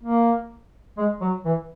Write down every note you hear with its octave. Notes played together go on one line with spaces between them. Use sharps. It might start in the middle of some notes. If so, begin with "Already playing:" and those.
A#3
G#3
F#3
E3